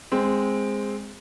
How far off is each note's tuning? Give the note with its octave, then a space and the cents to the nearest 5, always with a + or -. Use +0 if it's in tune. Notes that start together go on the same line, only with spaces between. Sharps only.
G#3 -10 C4 +0